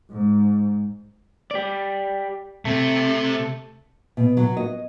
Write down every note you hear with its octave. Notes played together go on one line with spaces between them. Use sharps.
G#2
G4 D5
C3 A3
B2
F#3
D#5